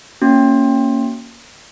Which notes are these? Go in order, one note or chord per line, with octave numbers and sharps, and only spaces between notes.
A#3 C#4 F#4